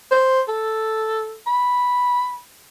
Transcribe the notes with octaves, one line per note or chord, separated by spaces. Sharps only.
C5
A4
B5